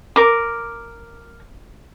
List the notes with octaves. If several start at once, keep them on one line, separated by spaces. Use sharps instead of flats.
A#4 D6